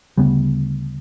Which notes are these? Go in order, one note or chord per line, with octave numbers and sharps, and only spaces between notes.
D2 C#3 G3 B3